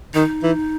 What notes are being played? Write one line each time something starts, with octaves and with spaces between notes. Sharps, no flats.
D#3 D#4
E3